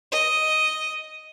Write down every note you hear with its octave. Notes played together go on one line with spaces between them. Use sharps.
D#5